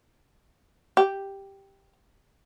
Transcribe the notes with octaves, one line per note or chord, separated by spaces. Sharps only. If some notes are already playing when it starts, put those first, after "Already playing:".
G4